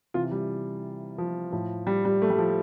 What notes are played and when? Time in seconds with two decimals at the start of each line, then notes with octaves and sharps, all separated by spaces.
0.14 C3 E3 F4
0.31 G3
1.18 F3
1.52 A2 F3
1.87 G3
2.05 G3
2.22 A3
2.30 G3
2.38 F3